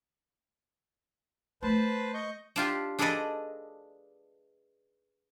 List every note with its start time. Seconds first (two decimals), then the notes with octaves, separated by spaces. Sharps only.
1.63 A3 B4 C5 A5
2.14 D#5 C#6 G6
2.56 D4 F4 G4
2.99 D4 G#4 A4 B4 D5 D#5